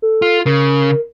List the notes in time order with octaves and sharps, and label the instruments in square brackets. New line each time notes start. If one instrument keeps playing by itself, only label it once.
[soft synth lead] A4
[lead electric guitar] F4
[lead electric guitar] C#3 [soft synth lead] A#4